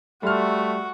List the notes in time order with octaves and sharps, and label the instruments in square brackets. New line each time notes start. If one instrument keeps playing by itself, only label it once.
[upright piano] G3 C6 F6 [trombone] A3 [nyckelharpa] F#4